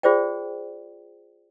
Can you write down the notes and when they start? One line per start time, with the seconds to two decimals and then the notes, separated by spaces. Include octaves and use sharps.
0.03 F4 G#4 C5 D5 G5